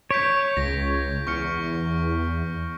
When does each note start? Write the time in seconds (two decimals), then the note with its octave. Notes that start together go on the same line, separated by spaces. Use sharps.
0.11 C#5 G6 B6 D7
0.57 C#2 A#6
1.27 E2 C#6 F6 C#7